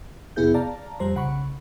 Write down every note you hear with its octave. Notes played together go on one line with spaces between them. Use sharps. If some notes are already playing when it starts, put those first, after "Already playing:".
F2 C3 B3 E4 G#4 G6
D5 F5 A5 A#5
F2 G3 C5 A#5
B1 C#3 F#5 B5 C#6